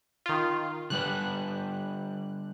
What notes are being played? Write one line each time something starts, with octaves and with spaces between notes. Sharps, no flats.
D#3 F4
D3 G3 B4 F#6